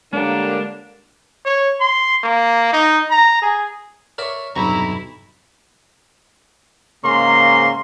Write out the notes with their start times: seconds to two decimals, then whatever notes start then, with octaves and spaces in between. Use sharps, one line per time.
0.13 D3 G3 G#3 A#3 D4 C#5
1.45 C#5
1.80 C6
2.24 A#3
2.73 D#4
3.11 A#5
3.42 G#4
4.18 A#4 C#5 D5 E5 C#6
4.56 B1 E2 G2 C3 E4 A#5 B5 C#6
7.04 G#2 C#3 A#3 A#5 C6